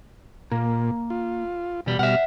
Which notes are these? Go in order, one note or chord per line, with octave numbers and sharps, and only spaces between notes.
A#2 A#3
F4
E2 B2 G3
B2 G3 E5 F#5 F6